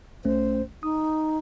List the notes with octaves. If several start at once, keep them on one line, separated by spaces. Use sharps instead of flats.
B1 A3 C#4 C5
D#4 D#6